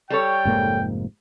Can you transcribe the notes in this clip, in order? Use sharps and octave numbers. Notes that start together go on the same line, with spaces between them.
G3 A4 C#5 G5
F1 G#2 A#3